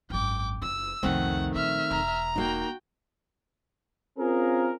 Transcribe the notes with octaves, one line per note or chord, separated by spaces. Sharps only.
G#1 F#2 G5 D6
F#1 F4 E6
C2 F2 D#3 A3 C4 F#5
A#1 G3 E5 F6
E1 A#5
A#3 D#4 F#4 G5
C4 C#4 F4 G#4 A#4